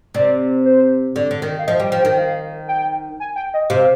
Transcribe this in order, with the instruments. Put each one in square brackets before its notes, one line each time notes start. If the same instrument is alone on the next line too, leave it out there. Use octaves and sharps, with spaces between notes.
[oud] C3 [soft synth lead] D5
[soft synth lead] C5
[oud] D3 [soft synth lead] D5
[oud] D3
D#3
[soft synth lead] F5
[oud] F3 [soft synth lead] D#5
[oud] G3 [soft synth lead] G5
[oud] F3
[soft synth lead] G5
[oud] D#3
[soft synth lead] F5
G5
G#5
G5
D#5
[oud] C3 [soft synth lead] F5